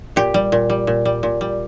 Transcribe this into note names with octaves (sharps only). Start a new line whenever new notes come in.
A#2 G4
G3
A#2
G3
A#2
G3
A#2
G3